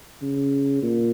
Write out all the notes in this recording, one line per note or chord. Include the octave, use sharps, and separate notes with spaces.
C#3
A#2